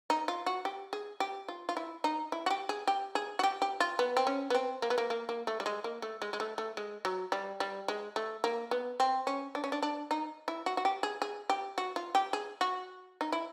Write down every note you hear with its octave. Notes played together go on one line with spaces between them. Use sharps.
D#4
F4
F#4
G4
G#4
G4
F4
F4
E4
D#4
E4
F#4
G4
G#4
G4
G#4
F#4
G4
G4
F4
B3
C4
C#4
B3
C4
A#3
B3
A#3
A#3
A#3
A3
G3
G#3
A#3
A3
G#3
G#3
A3
A3
G#3
F#3
G3
G3
G#3
A3
A#3
B3
C4
C#4
D4
C#4
D4
D4
D#4
E4
F#4
F#4
G4
G#4
G#4
G4
F#4
F4
G4
G#4
F#4
D#4
E4